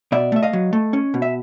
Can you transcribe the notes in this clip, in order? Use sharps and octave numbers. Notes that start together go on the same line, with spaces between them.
B2 D5 E5
A3 E5
D#5 F5
F#3
A3
C#4
B2
E5